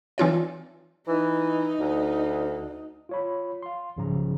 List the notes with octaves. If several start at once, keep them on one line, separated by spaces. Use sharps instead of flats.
E3 C4 D#4 F4 C#5 D5
E3 D#4
D2
F4 C#5 B5
F5 C6
B1 G#2 C#3 F3 C#4 A#5